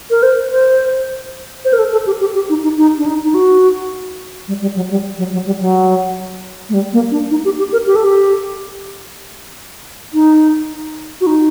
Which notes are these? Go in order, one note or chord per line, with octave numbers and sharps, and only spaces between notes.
A#4
C5
C5
C5
A#4
A4
A4
G4
G4
G4
D#4
D#4
D#4
D4
D#4
D#4
F#4
G3
G3
F#3
G3
F#3
F#3
G3
F#3
A3
G3
A#3
D4
D#4
G4
G4
A#4
G4
A4
G4
D#4
F#4
D#4